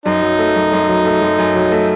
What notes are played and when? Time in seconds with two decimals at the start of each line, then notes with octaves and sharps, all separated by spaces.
0.06 F#2 D#4
0.22 F#3
0.39 A3
0.56 F#2
0.72 F#2
0.89 F#3
1.05 A3
1.22 F#2
1.39 F#2
1.55 F#3
1.72 A3